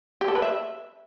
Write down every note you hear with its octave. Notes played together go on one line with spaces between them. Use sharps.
G4
A4
B4
E5